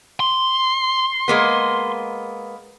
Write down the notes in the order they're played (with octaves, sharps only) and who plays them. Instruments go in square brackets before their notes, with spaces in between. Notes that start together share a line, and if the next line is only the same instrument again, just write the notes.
[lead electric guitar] C6
[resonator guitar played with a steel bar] G#3 A#3 B3